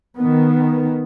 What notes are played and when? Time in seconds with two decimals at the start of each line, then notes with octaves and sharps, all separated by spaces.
0.16 D#3 B3